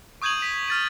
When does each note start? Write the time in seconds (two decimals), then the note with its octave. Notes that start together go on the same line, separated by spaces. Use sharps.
0.22 C#6 D#6 G6 G#6 D#7 F#7
0.42 B6
0.68 F6 A6 D#7